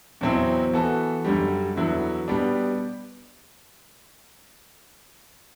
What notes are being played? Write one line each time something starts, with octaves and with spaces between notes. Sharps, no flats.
E2 B2 F#3 C4 E4
E3 B3 F#4 A4
F#2 D3 G3
E2 D3 F#3 B3 E4
B2 G3 B3 D4